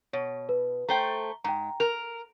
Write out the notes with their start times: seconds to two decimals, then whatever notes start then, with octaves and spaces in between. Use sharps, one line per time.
0.13 B2 C#5
0.49 B4
0.89 A3 C5 G5 A#5 G7
1.44 G#2 G5 A#5
1.80 A#4 F7